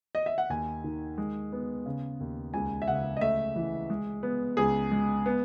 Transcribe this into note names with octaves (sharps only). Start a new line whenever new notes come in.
D#5
E5
F#5
D#2 G#5
D#3
G#3
B3
C#3
D#2
C#2 G#5
E5
C#3 F#5
D#5
A3 E5
E3
G#3
B3
C#2 G#4
G#3
B3